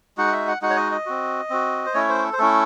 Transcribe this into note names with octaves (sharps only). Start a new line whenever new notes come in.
G#3 D#4 F#4 F#5
E5
F#5
G#3 D#4 F#4 F#5
C#5
D#5
D#5
C4 F#4
C4 F#4
C5
A3 C#4 E4 C#5
C5
A4
C5
A3 C#4 E4 A4